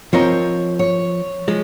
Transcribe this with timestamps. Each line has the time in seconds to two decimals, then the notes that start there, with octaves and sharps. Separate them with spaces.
0.13 F3 C4 F4 A#4 C#5 D#5
0.79 C#5
1.48 F3 G#3